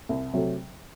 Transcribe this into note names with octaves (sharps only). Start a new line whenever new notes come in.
C2
C3 F#3 A3